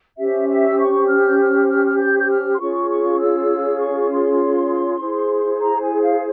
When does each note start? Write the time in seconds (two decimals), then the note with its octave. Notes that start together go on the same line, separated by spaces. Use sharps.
0.17 C#4 G4 C5 E5
0.48 E5
0.67 E6
0.78 C#6
1.07 F6
1.28 G6
1.38 F6
1.68 F6
1.87 F6
1.98 G6
2.19 G6
2.29 F6
2.53 C6
2.59 C#4 F4 G#4 C#5 C#6
2.89 C#6
3.19 E6
3.79 C#6
4.10 C6
5.00 E4 G#4 C5
5.60 A#5
5.81 G#5
6.00 F5